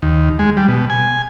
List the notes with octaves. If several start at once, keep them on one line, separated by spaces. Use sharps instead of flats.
D#2
G#3
G3
B2
G#5